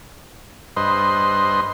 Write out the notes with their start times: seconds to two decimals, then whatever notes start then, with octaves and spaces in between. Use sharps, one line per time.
0.76 G2 B4 C5 D#5 C6